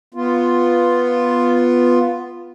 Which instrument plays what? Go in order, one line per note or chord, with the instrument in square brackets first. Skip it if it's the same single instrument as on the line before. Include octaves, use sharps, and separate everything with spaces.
[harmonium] B3 F4